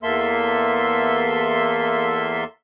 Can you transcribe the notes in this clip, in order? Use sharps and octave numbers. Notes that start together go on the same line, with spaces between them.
E2 A#3 A4 E5 C6